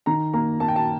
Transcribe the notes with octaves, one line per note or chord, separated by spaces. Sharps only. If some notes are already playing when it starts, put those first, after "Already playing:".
D#3 A#5
A#3 A#5
A#3 A5
G5
A5